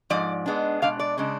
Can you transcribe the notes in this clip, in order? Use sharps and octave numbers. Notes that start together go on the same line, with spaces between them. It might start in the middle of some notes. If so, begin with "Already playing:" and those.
G#2 F3 D5
G#2 G#3 B3 D4
B2 G#3 D4 F5
D5
C#3 G#3 D4